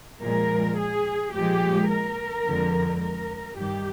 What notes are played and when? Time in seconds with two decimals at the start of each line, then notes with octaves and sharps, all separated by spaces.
0.22 A#2 F3 G#3 A#4
0.78 G#4
1.33 A#2 F3 G#3 G4
1.89 A#4
2.45 F2 D3 G#3
3.01 A#4
3.57 G2 D#3 G3 G4